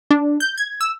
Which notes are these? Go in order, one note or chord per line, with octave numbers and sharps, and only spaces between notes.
D4
G6
G#6
E6